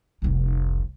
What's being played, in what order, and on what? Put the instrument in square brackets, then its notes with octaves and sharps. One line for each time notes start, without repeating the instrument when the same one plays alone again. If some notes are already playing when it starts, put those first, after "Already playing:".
[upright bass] F1 C2